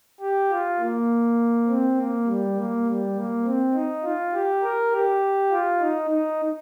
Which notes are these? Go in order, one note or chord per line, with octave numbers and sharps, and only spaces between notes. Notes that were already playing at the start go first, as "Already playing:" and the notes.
G4
F4
A#3
C4
A#3
G3
A#3
G3
A#3
C4
D#4
F4
G4
A#4
G4
F4
D#4
D#4